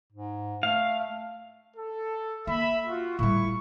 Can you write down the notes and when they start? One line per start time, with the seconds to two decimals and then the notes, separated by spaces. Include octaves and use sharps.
0.12 G#2
0.63 A3 F5
1.77 A4
2.47 A#3 E5 B5
2.87 F4 F#4
3.19 A2 G3 E4 C#6